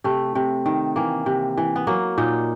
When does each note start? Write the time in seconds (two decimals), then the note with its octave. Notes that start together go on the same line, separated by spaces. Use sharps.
0.04 C3 A3
0.35 C3
0.66 D#3
0.96 E3 A#3
1.26 C3
1.57 E3
1.76 B3
1.87 F#3 A#3
2.18 A#2 D#4